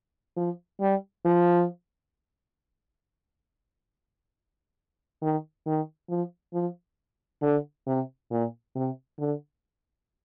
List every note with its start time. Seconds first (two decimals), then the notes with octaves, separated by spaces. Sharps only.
0.37 F3
0.81 G3
1.25 F3
5.22 D#3
5.66 D#3
6.09 F3
6.54 F3
7.42 D3
7.87 C3
8.31 A#2
8.75 C3
9.19 D3